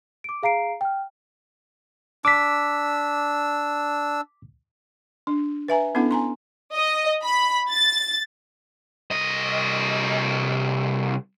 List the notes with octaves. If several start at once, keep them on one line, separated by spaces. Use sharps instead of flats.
D6 D7
G#4 F5 A#5 C7 D7
G5 F6
D4 D6 E6 B6
D4
B4 E5 G#5 A#5
B3 C#4 D4 E4 A4 F#5
G#5 A#5 C6
D#5
B5
A6
C2 D#5